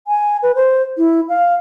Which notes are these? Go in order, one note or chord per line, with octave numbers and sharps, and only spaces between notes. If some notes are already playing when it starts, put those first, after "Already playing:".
G#5
B4
C5
E4
F5